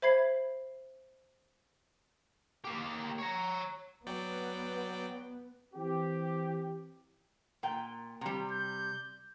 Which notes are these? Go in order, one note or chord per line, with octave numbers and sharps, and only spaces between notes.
C5 E5 B5 G#6 C7
A#3 G4
C#5 A#5
F#3 B3 D5 G5
E3 C4 G4
A#2 G5
C3 G3
G6